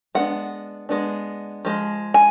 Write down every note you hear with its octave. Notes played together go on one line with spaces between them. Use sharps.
G#3 B3 D4 F#5
G#3 B3 D4
F3 G#3
G#5